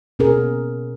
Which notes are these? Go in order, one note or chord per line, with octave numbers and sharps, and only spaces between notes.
B2 C#4 G#4 A#4